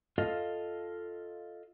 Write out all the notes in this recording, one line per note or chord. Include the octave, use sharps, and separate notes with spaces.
F4 A4 D#5 F5